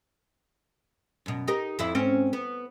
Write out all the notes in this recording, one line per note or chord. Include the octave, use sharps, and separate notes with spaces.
F#2 B2
D#4 G4 A#4
F2 E4 E5
G#2 C4 C#4
B3